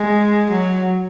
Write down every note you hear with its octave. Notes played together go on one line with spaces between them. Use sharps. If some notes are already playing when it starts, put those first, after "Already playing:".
Already playing: G#3
F#3